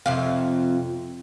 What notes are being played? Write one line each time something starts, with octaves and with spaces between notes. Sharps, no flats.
F2 C3 F5